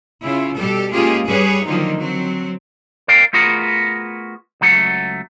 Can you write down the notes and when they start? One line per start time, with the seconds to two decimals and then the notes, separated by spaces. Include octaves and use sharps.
0.24 C#3 E4 F4
0.57 B2 G3 G4 A4
0.93 G#3 A#3 C#4 F4 G4 G#4
1.27 G2 G3 G#4 B4 C#5
1.66 D3 D#3 F3 F#3 A#3 D#4
1.98 F#3 C4
3.08 A#4 D5 F5 G5
3.33 A3 B3 F4 F#4 G#4 A#4
4.61 C#2 F#3 A3 F#5